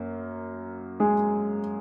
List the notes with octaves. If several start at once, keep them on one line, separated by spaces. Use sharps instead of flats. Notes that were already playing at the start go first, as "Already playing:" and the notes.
Already playing: F#2 A#3
G#3 G#4